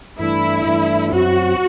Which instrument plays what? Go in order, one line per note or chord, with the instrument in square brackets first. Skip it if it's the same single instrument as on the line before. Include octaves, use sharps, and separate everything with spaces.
[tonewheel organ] G2 E3 A3 D4 [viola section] E4
[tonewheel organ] G2 E3 A3 D4
[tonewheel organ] F#2 F#3 C4 [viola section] F#4